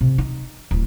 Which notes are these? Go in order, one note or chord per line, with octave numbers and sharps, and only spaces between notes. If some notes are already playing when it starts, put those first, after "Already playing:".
C3
D#4
D1